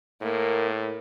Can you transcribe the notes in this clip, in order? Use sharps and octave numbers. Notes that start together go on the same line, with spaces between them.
A2 A#3